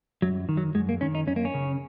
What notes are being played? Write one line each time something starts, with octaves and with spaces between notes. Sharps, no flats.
F#2 F#3
D#3
F#3
F#2 G#3
A#3
D#3 C#4
D#4
F#2 C#4
A#3
C#4
C#3